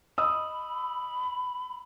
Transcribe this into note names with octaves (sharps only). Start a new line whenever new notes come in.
D#5 B5 D#6 E6